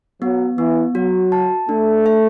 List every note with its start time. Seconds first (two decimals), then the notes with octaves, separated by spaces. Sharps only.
0.21 F#3 B3
0.58 E3 B3
0.95 F#3 F#4
1.32 A5
1.69 A3 D4
2.06 E5